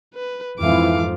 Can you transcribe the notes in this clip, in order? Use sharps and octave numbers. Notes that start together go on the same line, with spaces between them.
B4
F2 G#2 E3 F3 E4 F5 D6